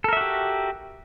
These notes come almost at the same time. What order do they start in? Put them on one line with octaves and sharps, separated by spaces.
A4 A#4 E5 F#4 G4